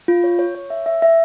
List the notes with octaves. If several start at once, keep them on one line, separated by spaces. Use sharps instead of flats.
F4
C#5
C#5
C#5
E5
E5
E5